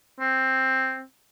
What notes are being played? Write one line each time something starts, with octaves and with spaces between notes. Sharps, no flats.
C4